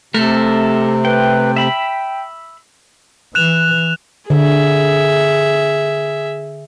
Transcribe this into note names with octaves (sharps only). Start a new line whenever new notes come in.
C3 A3 A4 A#4
B4 G5
E5 G5 B5
E3 F#6 E7 F7
D3 G#4 E5